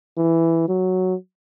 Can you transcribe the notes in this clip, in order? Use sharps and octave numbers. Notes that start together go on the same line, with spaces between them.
E3
F#3